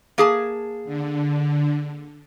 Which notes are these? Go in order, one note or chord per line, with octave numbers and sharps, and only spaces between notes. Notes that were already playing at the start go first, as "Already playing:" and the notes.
A#3 G#4 A5
D3